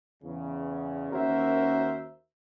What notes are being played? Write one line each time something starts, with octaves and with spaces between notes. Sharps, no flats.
E2 C#3
D#2 C#4 F#4 A#4 C5 E5